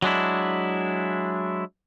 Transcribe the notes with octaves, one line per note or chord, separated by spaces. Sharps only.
F#3 G#3 D4 E4